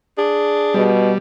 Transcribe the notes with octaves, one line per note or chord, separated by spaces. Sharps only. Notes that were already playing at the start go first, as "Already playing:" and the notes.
D4 G#4
B2 G3